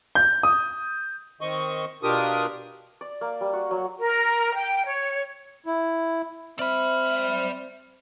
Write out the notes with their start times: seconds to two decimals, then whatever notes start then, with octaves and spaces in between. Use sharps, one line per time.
0.15 G6
0.43 D#6
1.41 D#3 C4 D#5 C#6
2.03 B2 D4 F4 G4 A#4 D#6
3.01 D5
3.21 A#3
3.41 G3
3.53 F#4
3.71 F#3
3.99 A#4
4.54 G5
4.85 C#5
5.66 E4
6.59 C4 D5 E5 B5 F6